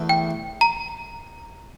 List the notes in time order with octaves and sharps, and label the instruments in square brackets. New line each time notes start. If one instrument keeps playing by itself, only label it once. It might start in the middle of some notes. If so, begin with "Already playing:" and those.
Already playing: [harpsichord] E2 E3 A3
[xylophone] G5
A#5